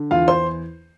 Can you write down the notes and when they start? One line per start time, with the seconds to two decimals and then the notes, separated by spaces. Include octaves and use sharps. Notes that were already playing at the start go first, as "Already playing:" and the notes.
Already playing: D3
0.11 E2 F4 F5
0.28 C5 C6